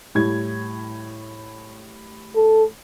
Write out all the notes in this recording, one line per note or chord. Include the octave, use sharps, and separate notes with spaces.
A2 G3 G#6
A4